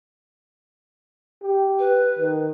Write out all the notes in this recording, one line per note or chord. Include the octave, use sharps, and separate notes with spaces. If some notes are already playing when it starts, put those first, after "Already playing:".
G4
B4
D#3